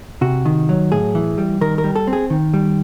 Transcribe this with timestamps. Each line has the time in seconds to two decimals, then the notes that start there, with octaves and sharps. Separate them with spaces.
0.21 C3 F#4
0.45 D#3
0.69 F#3
0.92 A2 G#4
1.15 E3
1.38 G3
1.61 D#3 A#4
1.78 A#4
1.84 G3
1.96 A4
2.07 C4
2.13 G#4
2.30 D#3
2.54 G3